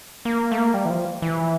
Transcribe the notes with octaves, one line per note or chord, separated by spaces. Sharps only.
A#3
A3
A#3
G3
E3
F3
E3